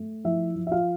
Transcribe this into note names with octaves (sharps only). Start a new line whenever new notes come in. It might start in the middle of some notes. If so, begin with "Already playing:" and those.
Already playing: A3
F3 E4 E5
F3
E5
F4 F5